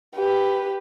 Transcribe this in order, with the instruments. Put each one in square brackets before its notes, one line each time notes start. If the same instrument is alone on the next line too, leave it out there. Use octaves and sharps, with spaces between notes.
[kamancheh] G4 B4